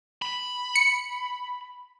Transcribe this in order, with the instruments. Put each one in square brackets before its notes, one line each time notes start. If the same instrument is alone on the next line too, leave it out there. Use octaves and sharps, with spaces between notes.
[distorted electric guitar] B5
[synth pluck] C#7